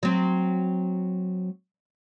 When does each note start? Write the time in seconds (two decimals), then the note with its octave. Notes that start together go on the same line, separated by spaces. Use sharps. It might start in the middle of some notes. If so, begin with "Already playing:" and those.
0.03 F#3 C4